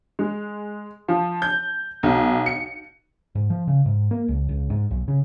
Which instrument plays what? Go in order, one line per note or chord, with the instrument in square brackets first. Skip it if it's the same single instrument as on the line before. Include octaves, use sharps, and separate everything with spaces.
[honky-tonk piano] G#3
F3
G6
B1
C#7
[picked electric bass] G#2
F3
C#3
G#2
A#3
C#2
C#2
G#2
B1
C#3